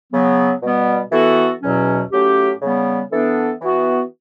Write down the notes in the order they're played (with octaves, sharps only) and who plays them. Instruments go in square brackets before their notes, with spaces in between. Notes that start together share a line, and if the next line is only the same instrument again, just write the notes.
[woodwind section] C#3 F#3 B3
B2 G3 B3
E3 B3 F#4 A4
E2 B2 F#3 C#4
A2 F#3 A3 C#4 G4
C#3 G3 B3
E3 B3 D4 A4
E3 B3 F#4